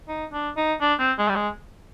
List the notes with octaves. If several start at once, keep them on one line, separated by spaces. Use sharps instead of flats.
D#4
D4
D#4
D4
C4
G#3
G3
G#3